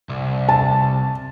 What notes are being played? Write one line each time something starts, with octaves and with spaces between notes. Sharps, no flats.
C2
A5